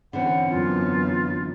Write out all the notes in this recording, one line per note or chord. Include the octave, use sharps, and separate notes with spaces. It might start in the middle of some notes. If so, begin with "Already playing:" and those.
D3 E3 C4 C#4 F#5
F#2 B3 F4